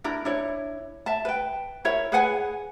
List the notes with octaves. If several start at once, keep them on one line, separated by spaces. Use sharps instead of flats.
D4 E4 A#4
D4 E4 C#5
E5 A5
B4 G5
E4 A#4 C#5 E5
G#4 B4 F#5 G#5